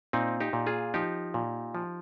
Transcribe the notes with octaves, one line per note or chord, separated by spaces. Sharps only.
A#2 C4 D#4
D#4 G4
A#2
F4 G#4
F3 D#4 G4
A#2
F3